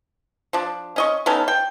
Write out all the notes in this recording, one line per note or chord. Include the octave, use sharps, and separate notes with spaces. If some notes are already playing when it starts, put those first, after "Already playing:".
F3 D4
C#4 D#5 C#6
B3 C#4 D#4 A4
G5